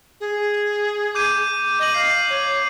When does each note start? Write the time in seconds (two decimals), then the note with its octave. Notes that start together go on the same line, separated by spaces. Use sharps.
0.20 G#4
1.15 D6 G6 D#7
1.79 D#5 D#7 F#7
1.94 F5 G6 C7 F#7
2.30 C#5